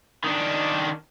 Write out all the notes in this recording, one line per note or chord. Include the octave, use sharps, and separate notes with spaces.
D#3 D4